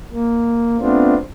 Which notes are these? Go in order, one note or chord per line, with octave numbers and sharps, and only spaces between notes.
A#3
A3 B3 C4 D4 F4